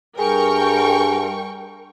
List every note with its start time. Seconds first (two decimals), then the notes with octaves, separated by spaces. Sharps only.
0.19 G2 G#4 A#4 G5 C#6